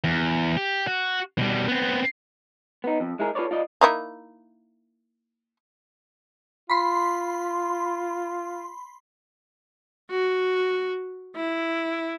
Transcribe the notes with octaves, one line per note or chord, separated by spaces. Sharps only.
E2
G4
F#4
B2 G3
B3 C4
B3 D#4
F2
G#3 E4 G#4 A#4
F4 A4 B4 C#5 D5
F4 D5 D#5
A#3 D#4 E4
F4 B5 C6
F#4
E4